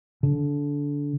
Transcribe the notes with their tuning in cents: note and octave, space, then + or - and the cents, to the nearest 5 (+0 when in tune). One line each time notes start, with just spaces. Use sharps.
D3 -20